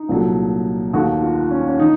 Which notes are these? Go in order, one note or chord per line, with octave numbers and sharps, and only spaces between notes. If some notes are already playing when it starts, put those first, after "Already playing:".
Already playing: D#4
C2 A#2 F#3 A3
D#2 D#3 A3 F#4
F4
C#4
C#4
D#3 D#4